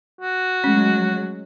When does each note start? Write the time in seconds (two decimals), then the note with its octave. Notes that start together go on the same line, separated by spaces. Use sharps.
0.21 F#4
0.64 F#3 G#3 A3 C#4